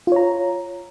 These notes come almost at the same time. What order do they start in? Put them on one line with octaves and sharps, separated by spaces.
F4 C#5 A#5